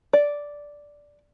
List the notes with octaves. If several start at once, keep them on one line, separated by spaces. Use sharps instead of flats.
D5